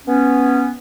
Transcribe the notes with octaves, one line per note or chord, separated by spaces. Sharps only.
B3 C#4